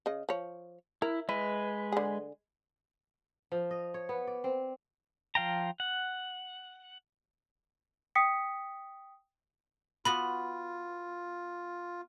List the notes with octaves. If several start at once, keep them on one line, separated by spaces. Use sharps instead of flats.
C#3 D#5
F3 C#5
E4 A#4
G#3 E4 B4
D3 G#4
F3
D#5
C#5
B3
D5
C4
F3 F5 G5 A#5
F#5
G5 D#6 B6 C#7
B3 F4 F#4 B4 B5